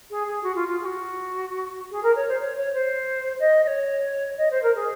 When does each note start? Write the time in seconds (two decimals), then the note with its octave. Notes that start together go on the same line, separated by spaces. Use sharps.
0.10 G#4
0.27 G#4
0.43 F#4
0.55 F4
0.68 F4
0.80 G#4
0.85 F#4
1.91 G#4
2.03 A#4
2.15 C#5
2.28 C5
2.40 C#5
2.57 C#5
2.73 C5
3.39 D#5
3.63 D#5
3.67 C#5
4.37 D#5
4.50 C5
4.62 A#4
4.75 G#4